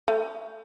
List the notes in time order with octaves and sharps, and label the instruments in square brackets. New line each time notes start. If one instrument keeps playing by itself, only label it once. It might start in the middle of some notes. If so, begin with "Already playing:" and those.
[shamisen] A3